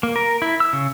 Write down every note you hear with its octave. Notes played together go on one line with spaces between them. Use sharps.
A#3
A#4
E4
E6
C#3